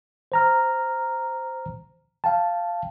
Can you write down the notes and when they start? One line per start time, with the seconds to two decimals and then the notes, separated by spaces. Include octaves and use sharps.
0.32 C5 A#5 F6
2.24 F5 G5 A5